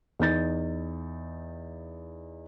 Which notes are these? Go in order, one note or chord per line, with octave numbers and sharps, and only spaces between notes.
E2 D#4 G6 A6